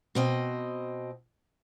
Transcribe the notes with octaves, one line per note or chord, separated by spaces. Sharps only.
B2 C4 D#5